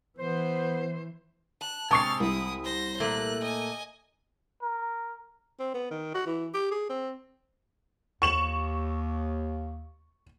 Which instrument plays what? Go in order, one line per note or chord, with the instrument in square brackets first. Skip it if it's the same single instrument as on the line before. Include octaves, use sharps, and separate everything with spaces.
[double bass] E3 [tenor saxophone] B3 [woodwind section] C5
[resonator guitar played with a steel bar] A5 [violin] F#6
[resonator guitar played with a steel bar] C3 G#3 [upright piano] A5 C#6 C7 [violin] F6 A6
[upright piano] C2 [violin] E4 D#6
[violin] C5 A#6
[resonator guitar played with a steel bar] A#2 A3 A#3 [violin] F#6
[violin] D#5 G#5
[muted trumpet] A#4
[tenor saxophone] C4
B3
D#3
F#4
E3
G4
G#4
C4
[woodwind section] D#2 [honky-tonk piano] C#6 E7 F#7